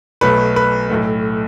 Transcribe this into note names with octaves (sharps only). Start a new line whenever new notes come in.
B1 B2 F#3 A3 B4
B4
B1 A2 A3